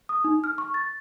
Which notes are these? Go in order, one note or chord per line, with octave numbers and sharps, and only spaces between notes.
D#6
D#4
F6
C#6
A6